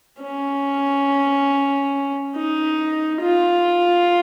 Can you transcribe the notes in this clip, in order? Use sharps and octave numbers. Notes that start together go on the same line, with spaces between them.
C#4
D#4
F4